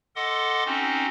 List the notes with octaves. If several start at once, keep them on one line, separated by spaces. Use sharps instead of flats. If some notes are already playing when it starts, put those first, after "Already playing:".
A4 D#5 F#5 C6 D6
C4 C#4 D#4 F#4